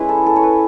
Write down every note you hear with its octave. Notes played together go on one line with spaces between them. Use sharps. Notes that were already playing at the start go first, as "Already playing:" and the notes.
Already playing: G#3 C#4 E4 B4
A4
A4
C#5
B4